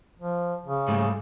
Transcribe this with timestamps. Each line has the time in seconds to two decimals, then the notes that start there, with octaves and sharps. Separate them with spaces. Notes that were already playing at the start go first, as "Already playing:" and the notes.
0.19 F3
0.65 C#3
0.88 G#2 G3 A3